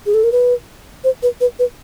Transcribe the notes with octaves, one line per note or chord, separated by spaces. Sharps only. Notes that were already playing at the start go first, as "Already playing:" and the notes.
G#4
A4
A#4
B4
C5
B4
B4
B4